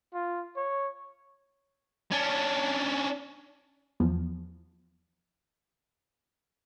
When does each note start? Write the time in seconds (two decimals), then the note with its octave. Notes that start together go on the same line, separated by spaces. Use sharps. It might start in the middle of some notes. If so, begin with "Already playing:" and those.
0.14 F4
0.57 C#5
2.12 C#4 D4
4.00 E2 F3